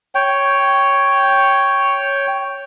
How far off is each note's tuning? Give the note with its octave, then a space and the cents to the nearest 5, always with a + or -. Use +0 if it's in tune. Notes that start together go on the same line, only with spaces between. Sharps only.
C#5 +0 G5 +0